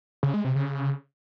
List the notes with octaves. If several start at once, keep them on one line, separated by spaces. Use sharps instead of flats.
C#3
G#3
C3
C#3